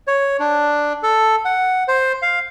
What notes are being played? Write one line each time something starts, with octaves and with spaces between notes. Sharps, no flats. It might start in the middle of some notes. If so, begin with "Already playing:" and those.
C#5
D4
A4
F#5
C5
F5